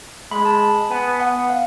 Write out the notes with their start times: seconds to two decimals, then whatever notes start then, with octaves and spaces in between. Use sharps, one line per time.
0.31 G#3 B5
0.45 A5
0.90 B3 G#5
1.20 F#5
1.49 F5